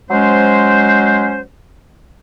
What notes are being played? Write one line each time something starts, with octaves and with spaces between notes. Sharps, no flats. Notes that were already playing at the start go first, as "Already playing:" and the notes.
F#3 G#3 C#4 C5